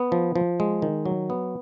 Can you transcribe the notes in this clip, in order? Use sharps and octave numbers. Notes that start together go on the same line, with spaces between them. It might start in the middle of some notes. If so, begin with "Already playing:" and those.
Already playing: B3
F3
F3
G#3
D#3
F#3
B3